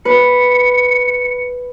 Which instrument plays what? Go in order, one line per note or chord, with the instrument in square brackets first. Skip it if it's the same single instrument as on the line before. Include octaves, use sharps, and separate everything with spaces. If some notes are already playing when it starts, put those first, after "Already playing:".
[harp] B4 [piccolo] C#7